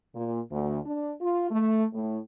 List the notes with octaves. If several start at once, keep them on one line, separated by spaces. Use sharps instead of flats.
A#2
D2
D4
F4
A3
A2